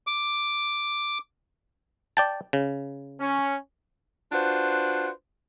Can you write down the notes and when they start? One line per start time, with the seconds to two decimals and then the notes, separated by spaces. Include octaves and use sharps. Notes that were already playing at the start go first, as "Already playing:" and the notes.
0.07 D6
2.17 D5 G5 A5
2.53 C#3
3.20 C#4
4.32 D4 F4 F#4 B4 C5